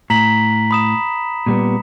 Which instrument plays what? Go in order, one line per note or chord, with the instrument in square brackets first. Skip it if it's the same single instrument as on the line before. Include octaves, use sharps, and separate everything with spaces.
[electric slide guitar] A2 [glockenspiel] A#5 B6 F#7
[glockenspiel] B5 D#6 E7
[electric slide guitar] A#2 G3 B3